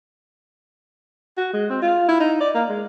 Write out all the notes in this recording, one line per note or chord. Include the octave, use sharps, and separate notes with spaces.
F#4
G#3
C4
F4
E4
D#4
D5
A#3
G#3